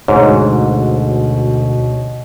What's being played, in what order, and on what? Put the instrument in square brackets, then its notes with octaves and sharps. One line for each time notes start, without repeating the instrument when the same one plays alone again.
[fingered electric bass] D2 [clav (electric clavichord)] G#2 [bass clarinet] B2 [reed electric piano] C#5